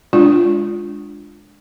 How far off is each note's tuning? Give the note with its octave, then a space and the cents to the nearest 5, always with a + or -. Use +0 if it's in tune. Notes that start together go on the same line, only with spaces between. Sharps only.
G#3 +0 D4 +0 F4 +0